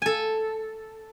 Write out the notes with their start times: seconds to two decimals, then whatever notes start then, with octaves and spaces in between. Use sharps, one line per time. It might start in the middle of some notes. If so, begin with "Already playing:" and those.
0.02 A4 G#5